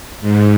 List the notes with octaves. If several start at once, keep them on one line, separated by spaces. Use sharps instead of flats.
G#2